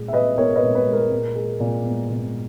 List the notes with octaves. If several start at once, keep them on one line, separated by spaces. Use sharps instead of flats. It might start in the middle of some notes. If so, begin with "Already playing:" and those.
Already playing: A#2 G#3
E5
A#2 B4 D#5
B3 A#4 C#5
B4 D#5
A#2
B4
G#3
A#4
A#2
G#3
A#2
B3
A#2